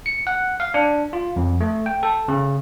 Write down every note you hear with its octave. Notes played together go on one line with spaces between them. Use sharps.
C#7
F#5
F5
D4
F4
F2
A3
G5
A4
C#3